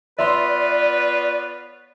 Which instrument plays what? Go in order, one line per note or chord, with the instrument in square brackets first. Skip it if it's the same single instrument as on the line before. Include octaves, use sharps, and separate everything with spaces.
[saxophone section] B3 F4 C#5 [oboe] B4 [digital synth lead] D5 [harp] E5 C6